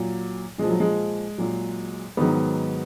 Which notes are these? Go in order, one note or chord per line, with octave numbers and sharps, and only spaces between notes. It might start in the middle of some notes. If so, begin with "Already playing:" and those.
Already playing: A#2 F#3
A#2 F3 G#3
F#3
G#3
A#2 F#3
G#2 D#3 F#3 B3